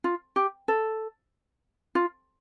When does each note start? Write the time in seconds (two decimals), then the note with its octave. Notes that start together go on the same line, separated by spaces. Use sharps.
0.04 F4
0.36 G4
0.68 A4
1.95 F4